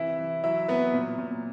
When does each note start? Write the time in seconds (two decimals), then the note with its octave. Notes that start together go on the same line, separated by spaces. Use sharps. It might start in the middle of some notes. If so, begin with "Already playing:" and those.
Already playing: C3 E3 E4 E5
0.19 E3
0.43 F#3 E4 E5
0.68 F#3 B3 B4
0.94 A#2
1.18 A#2